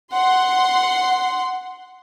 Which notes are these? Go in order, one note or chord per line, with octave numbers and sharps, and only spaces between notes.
F#5 C6